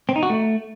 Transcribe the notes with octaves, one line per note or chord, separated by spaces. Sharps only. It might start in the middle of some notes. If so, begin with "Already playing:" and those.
C4
D#4
F#4
A3